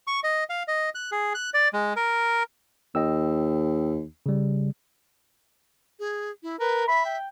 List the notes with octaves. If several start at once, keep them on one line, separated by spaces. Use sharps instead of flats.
C#6
D#5
F5
D#5
F#6
G#4
F#6
D5
G#3
A#4
D#2 D#5 G5 E6
C#3 G3
G#4
E4
A#4 B4
E5 B5
G5